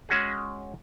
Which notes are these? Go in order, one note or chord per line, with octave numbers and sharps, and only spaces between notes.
G#3 C#4 F#4 G#4